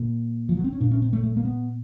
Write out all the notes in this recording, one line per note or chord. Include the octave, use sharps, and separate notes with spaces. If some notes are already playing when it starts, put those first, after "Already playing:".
Already playing: A#2
F3
F#3
C4
C#4
A#2 D4
C#4
C4
A3
A3
A#3
B3